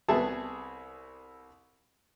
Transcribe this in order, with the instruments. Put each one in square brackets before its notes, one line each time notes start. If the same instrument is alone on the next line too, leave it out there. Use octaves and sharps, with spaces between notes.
[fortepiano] C2 B3 G#4 A4 E5 A5